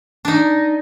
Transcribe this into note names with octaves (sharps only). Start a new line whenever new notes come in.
D4 D#4